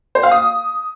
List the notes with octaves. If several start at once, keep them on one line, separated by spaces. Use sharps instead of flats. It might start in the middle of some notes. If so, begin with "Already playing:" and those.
C5
F5
D#6